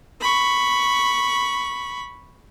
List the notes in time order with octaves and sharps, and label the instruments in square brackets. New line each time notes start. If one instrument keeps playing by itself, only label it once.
[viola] B5 C#6